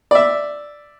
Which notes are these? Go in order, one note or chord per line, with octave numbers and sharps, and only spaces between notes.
D5 E5